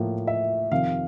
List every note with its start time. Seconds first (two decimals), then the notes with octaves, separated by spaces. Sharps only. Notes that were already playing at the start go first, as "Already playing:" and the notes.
Already playing: A2 F3 A#3
0.27 E5
0.72 F2 C3 D#3 F5